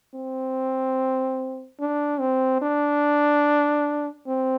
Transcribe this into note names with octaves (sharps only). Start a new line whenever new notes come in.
C4
D4
C4
D4
C4